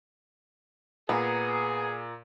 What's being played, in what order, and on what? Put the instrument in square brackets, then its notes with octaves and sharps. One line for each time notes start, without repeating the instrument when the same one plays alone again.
[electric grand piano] A#2 A#5 [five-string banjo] B3 [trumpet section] G#4